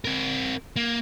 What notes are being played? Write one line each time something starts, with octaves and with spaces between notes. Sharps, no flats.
C4 A#4
A#3